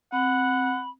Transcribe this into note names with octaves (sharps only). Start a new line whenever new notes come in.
C4 F#5 B5